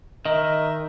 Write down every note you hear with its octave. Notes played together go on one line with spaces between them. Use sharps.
D#3 A#4 D#5 E5